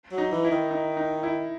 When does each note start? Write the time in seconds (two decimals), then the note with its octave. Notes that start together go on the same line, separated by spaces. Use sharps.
0.12 F#3
0.18 D#4
0.32 E3
0.45 E4
0.51 D#3
0.71 D#4
0.97 D#4
1.23 E4